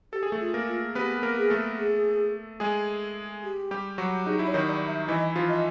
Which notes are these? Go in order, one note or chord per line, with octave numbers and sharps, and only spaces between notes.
G4 A4
G#4
A3 A4
F4
A#3 A#4
F4
B3 G4 B4
A#3 A#4
G#4
A3 A4
G#4
G#3 G#4
G4
G3 G4
F#3 F#4
D#4 G#4
E4
C#5
D#3 D#4
D5
E5
E3 E4 D#5
F3 F4
D#5